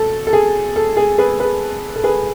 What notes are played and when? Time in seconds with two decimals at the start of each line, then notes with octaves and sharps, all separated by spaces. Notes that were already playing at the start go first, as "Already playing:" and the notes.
Already playing: B2 A4
0.27 A4
0.33 G#4
0.76 A4
0.97 G#4
1.18 G#4 B4
1.40 G#4 B4
1.96 A4
2.04 G#4 B4